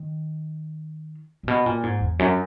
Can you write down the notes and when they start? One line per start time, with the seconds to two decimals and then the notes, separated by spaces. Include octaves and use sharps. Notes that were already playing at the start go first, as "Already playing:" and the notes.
Already playing: D#3
1.43 A#2
1.48 B2
1.66 A#2
1.83 G#2
2.01 E2
2.19 F#2